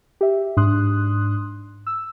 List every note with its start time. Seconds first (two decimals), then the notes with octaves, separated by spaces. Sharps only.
0.21 G4 E5
0.57 G#2 D4 C6 D#6 F#6
1.87 E6